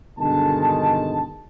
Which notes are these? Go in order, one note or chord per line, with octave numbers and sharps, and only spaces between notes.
G2 B2 D3 D#3 G#3 A5